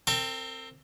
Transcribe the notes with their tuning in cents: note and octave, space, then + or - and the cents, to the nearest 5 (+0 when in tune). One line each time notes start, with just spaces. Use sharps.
C4 +10 A#4 -40